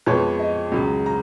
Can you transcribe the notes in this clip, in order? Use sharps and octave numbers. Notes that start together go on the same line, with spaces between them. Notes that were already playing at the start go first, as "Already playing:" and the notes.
F2 F3 G#3 B3 C#5
D#5
C#2 C#3 F#3
A#5